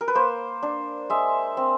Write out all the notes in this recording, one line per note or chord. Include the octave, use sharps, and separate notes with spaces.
A#4
B4
A#3 C5
D4
G#3 E5
C4